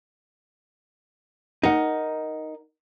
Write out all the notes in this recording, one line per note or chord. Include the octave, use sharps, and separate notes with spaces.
D#4 A#4 F#5